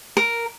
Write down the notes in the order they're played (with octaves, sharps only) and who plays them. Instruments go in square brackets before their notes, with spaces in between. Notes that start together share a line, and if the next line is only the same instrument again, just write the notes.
[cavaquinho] A#4